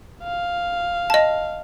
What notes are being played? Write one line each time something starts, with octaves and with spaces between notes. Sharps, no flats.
F5
D#5 A5